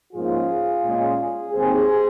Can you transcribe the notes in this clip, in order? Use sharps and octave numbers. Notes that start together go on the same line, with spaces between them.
G#2 F3 A#3 C#4 F4 G#4
A#2 G#3 C#4
D#2 D#3 G#3 C4 G#4 C5